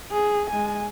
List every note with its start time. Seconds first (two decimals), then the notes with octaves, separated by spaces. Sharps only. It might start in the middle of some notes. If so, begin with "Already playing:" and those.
0.12 G#4
0.50 G#3 G#5